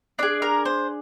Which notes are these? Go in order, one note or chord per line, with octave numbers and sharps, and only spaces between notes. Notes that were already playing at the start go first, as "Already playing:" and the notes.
D4 G#4 D5
A#4
C5